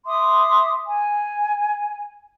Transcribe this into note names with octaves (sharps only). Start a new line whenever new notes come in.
E5 C6 D6 D#6
G#5